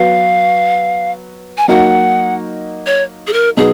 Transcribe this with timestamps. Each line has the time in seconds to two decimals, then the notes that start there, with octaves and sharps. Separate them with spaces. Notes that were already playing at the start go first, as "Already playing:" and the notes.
Already playing: F#3 B3 F#4 F5
1.58 G#5
1.68 F#3 A#3 D#4 F#4 F#5
2.86 C#5
3.27 G#4
3.33 A#4
3.57 B2 F#3 B3 D#4 G#4